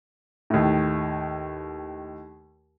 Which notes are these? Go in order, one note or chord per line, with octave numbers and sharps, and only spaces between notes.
D#2 A2